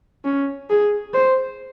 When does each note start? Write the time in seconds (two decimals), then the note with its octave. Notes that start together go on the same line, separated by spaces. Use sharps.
0.25 C#4
0.70 G#4
1.14 C5